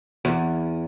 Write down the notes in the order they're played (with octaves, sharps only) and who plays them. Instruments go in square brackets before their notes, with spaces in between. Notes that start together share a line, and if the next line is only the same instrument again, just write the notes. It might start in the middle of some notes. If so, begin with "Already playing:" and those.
[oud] E2